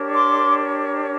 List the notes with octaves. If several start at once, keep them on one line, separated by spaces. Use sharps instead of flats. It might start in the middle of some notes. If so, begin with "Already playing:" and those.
Already playing: D4 G4 A#4 C#5
C6 D6